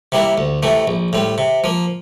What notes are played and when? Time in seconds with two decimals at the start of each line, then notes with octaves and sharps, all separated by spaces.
0.12 C3 G3 A#3 E4
0.38 D2
0.63 C3 E3 A3
0.88 A#1
1.13 A2 G3 C4
1.38 C3
1.64 F3 A#3